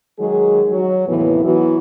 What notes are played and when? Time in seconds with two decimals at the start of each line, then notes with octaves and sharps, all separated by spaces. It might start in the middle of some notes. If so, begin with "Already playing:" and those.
0.19 D#3 F#3 G#3 G#4
0.70 F#3
1.08 D#2 A2 C3 E3 B3
1.44 E3 F#3 B3 F#4